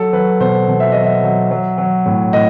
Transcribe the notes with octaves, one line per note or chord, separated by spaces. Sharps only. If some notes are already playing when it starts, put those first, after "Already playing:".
Already playing: F#3 A4
F#3 B4
B2 C5
B2
E5
F#3 D#5
E5
F#3
F#3
F#3
A2
A2 D#5